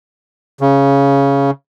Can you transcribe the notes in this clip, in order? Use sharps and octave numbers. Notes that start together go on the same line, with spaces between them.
C#3